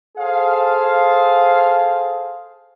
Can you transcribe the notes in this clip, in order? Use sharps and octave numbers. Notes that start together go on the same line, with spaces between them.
G#4 A4 C5 F5